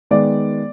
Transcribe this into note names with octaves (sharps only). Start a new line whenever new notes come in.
D#3 G#3 B3 D5